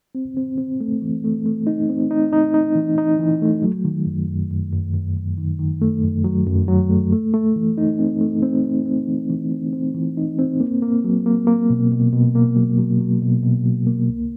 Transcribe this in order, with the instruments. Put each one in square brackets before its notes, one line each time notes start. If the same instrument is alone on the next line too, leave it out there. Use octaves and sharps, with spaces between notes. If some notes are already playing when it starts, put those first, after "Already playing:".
[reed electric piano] C4
C4
C4
A3
E3
A3
A3
D#4
C4
D#4
D#4
D#4
E3
D#4
E3
A3
F#3
D#3
F#2
F#2
F#2
F#2
F#2
F#2
D#3
D#3
A3
F#2
F#3
F#2
F#3
A3
A3
A3
E3
D#4
C4
A3
C4
C4
C4
E3
E3
C4
C4
E3
D#4
C4
A#3
A#3
F#3
A#3
A#3
B2
B2
B2
A#3
F#3
F#3
F#3
B2
B2
F#3
A#3
C2